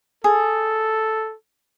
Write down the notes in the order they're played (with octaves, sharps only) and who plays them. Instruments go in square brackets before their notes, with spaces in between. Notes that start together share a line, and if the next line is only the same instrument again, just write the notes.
[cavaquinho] G#4 [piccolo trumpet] A4